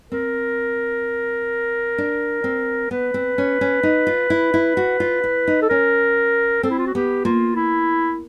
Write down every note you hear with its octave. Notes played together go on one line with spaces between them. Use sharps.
C4 A#4
D4
C4
B3 B4
C4
C#4
C#4
D#4
F4
E4
E4
F#4
F4
E4
D#4
A4
C#4 A#4
C4 A4
E4
F4
F#4
B3 G4
A#3 F4
E4